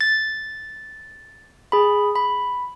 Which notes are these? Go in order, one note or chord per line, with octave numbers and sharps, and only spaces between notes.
A6
G#4 B5
B5